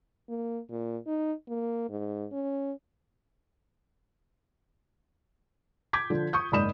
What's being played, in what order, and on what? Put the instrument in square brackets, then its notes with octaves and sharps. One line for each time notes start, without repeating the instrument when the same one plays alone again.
[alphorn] A#3
A#2
D#4
A#3
G#2
C#4
[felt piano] D6 G6 G#6 B6
D3 F3
C#6 D#6 G6
F#1 G#2 D5 B5 D#6 E7